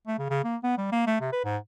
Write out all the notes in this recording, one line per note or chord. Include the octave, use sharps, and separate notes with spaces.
A3
C#3
C#3
A#3
B3
G3
A#3
A3
C3
B4
G#2